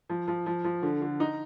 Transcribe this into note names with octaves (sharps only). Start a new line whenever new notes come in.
F3
F3
F3
F3
D3
D3
D#4